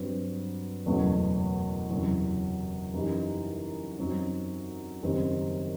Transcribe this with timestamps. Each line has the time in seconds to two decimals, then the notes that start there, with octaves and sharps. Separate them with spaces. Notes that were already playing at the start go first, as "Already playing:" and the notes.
Already playing: G2 F#3 C4
0.86 F#1 E2 B2 F#3 A3
1.90 F#1 E2 C3 F#3
2.94 F#2 E3 G3 D#4
3.98 F#2 F#3 C4 D#4
5.03 F#1 F#2 D#3 G3 C4